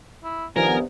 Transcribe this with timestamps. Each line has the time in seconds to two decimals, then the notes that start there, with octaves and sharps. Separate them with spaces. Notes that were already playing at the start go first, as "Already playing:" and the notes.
0.24 E4
0.56 G2 C3 D#3 F3 B3 A#4 G#5